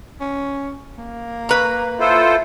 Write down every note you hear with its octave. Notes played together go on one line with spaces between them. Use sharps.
C#4
A#3
B4 A#5
E4 F4 A4 C5